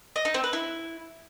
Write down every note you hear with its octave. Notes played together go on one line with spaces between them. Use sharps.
D#5
D#4
C4
B4
E4